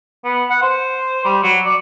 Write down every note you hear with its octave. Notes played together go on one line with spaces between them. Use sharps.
B3
F#5
C5
G3
F#3
D5